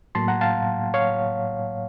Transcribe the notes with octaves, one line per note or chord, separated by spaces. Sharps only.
A2 F#3 A#3 A5 C6
F#5 A#5
F5 A5
C#5 F5